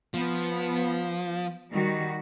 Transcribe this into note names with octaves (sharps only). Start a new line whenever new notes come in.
F3 B3
D#3 G3 F#4